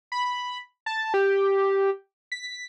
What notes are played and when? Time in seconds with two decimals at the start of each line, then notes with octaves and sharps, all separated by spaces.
0.12 B5
0.86 A5
1.14 G4
2.32 B6